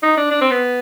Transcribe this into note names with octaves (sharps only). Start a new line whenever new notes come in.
D#4
D4
D4
C4
B3